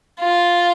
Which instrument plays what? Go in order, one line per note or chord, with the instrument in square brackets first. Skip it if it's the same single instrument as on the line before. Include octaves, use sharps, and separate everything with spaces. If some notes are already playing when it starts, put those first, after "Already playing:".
[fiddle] F4